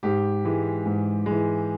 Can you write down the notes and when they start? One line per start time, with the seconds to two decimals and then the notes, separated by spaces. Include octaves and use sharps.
0.03 G#2 G4
0.45 E3 G#3
0.86 G#2
1.26 E3 G#3